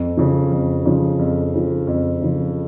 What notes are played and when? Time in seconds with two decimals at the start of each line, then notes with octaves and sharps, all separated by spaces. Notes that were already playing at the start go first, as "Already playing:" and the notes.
Already playing: F2
0.17 C#3 F3
0.52 F2
0.86 C#3 F3
1.19 F2
1.53 C#3 F3
1.87 F2
2.22 C#3 F3